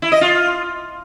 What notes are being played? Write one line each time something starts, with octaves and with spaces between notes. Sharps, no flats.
E4
D#5
F4